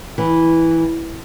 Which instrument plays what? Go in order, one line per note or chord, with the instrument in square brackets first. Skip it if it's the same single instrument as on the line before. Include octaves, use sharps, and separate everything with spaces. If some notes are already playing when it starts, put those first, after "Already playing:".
[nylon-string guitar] E3